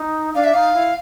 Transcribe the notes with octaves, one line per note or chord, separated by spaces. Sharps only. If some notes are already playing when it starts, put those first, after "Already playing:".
Already playing: D#4
D4 F5
E5
D#4 F5
E4